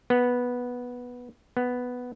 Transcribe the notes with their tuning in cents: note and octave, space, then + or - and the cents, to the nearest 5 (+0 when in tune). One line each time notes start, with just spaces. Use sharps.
B3 -5
B3 +5